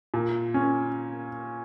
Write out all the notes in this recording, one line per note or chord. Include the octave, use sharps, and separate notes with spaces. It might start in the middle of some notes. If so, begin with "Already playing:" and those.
A#2
C#4